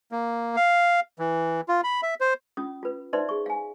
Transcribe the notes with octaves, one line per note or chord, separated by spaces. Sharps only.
A#3
F5
E3
F4
B5
E5
C5
C#4 F4 D#6
F4 B4
D#4 B4 C5 D5 E5 C6
G#4 C#6
F5 G#5